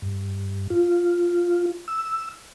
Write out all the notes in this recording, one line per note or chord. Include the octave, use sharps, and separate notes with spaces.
G2
F4
E6